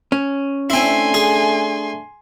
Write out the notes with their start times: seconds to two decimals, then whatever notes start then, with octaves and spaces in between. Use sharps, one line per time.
0.12 C#4
0.70 A3 C4 D4 E4 G#5 C6
1.14 G#4